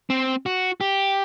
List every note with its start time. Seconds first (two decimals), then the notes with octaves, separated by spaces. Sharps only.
0.10 C4
0.46 F#4
0.81 G4